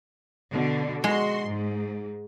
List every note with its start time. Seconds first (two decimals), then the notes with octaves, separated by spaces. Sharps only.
0.52 B2 D3
1.04 G#3 F#4 C6
1.46 G#2